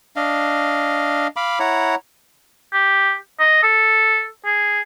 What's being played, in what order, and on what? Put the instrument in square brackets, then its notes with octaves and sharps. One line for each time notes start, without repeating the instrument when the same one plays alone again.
[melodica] D4 D#5 F5
F5 B5 D6
E4 C#5 F#5 A#5
[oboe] G4
D#5
A4
G#4